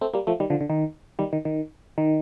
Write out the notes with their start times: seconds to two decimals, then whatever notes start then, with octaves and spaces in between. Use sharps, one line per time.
0.01 A3 C4
0.14 G3 A#3
0.27 F3 A3
0.40 D#3 G3
0.50 D3 F3
0.61 D3
0.70 D#3
1.19 D#3 G3
1.33 D#3
1.45 D#3
1.98 D#3